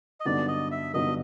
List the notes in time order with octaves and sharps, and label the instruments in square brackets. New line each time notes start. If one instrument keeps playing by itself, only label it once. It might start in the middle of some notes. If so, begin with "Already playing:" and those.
[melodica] D#5
[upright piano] G2 D3 F#3 B3 D#4 [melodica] D5
[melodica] D#5
E5
[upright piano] G2 D3 F#3 B3 D#4 [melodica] D#5